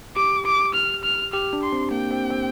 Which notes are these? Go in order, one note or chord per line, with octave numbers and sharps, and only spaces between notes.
G4 D6
D6
F6
F6
G4 F6
D4
C6
C4
A#3 G5
C4
C4